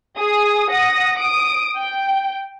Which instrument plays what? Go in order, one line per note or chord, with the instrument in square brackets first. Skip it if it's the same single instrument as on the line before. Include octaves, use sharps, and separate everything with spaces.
[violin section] G#4 D#6
F#5 D#6 A#6
D#6 D7
G5